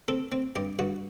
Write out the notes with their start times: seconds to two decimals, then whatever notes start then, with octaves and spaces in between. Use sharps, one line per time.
0.08 C4 A4
0.32 C4
0.56 G2 G4
0.79 G2 F#4